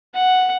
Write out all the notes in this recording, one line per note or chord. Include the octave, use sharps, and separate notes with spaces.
F#5